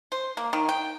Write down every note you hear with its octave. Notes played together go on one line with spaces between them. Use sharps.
C5
A#3
D#3
G5